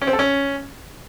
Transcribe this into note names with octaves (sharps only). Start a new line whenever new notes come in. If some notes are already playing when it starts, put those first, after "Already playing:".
C#4
C4
A4
C#4